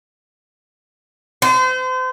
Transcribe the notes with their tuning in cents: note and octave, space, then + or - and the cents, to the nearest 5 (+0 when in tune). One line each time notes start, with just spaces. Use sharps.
C5 -35